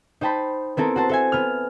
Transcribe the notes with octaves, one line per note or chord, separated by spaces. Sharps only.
D#4 C5 G5 A5 B5
B3 C4 E4 A4 A#4
F#4 C5 A5
A4 E5 G#5
B3 F6